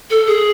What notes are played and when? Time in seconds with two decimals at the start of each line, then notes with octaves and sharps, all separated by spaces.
0.10 A4
0.27 G#4